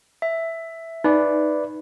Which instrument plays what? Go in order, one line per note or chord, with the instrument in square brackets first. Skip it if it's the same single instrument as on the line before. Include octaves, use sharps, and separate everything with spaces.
[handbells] E5
[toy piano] D#4 [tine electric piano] B4 D5